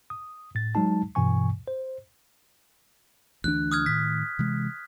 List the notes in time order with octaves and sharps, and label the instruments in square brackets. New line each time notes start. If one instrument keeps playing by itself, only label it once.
[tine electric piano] D#6
A2 A6
F#3 G#3 D#4 A5
G2 B2 E3 G#5 C#6
C5
[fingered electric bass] D2 E3 D4 [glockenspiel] F#6
[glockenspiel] D#6 F6 G#6
[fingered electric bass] A2 D#3 [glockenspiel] B6
[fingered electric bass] C3 E3 G#3